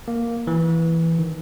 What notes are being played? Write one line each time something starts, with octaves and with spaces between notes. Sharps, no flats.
A#3
E3
D#3